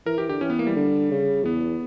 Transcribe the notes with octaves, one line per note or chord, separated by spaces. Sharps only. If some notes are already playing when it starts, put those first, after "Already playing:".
E3 A#4
E3 G4
D3 G4
E3 C#4
B3
A#3
G3
D3
C#3
E2 B3